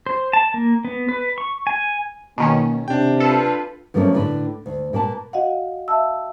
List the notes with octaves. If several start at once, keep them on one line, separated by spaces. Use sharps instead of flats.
C5
A5
A#3
B3
B4
C#6
G#5
B2 D#3 A#3 C#4
C3 D4 G5
F4 A4 B4
G2 F3 F#3 A3 A#3 C#4
A2 D3 B4
D2
A#2 A#3 B4 A5
F#4 D#5 F5 F#5
E5 F5 A5 E6